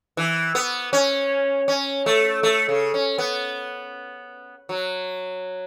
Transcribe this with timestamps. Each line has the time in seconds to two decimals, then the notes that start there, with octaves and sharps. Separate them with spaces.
0.17 E3
0.55 B3
0.93 C#4
1.68 C#4
2.06 A3
2.43 A3
2.69 C#3
2.94 C#4
3.18 B3
4.69 F#3